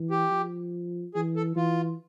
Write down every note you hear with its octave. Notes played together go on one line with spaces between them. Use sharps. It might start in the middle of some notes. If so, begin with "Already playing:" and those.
Already playing: E3
G4
F3
E3 G#4
A4
E3 F4